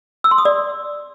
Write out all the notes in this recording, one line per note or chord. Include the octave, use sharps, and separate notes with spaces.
E6
C6
D#6
D5